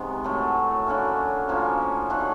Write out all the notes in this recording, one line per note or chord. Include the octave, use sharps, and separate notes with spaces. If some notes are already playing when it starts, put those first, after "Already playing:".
Already playing: C3 D#3 G#3 B3
A2 F#3 A3
D3 F#3 A#3 C#4
A2 F3 A#3 C#4
D#3 F#3 A3 D4